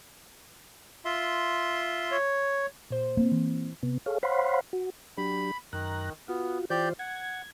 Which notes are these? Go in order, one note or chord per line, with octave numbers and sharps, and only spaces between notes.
F4 E5 C6
C#5
A#2 C5
A#3 C4
E3
C3 B3
G#4 A4 C#5 F5
C5 C#5 F5 F#5 B5 C6
F#4
F#3 D4 G4 B5
F#2 D#3 A#5 F#6
B3 F4 F#4
E3 F4 G4 C5 D5 G6
F#5 G#6